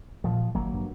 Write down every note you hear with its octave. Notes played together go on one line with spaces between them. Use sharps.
A#2 F3
G#1 F#3 A#3
G2